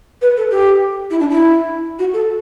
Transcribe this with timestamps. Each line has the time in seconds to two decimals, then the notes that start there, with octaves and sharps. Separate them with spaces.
0.22 B4
0.37 A4
0.51 G4
1.11 E4
1.20 D4
1.30 E4
1.99 F#4
2.14 A4